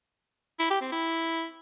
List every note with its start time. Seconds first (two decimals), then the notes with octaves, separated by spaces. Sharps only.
0.60 E4
0.70 G4
0.81 C4
0.92 E4